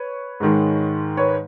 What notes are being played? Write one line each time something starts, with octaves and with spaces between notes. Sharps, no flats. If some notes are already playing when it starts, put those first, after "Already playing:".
Already playing: B4 C#5
G#2 D#3 G#3
B4 C#5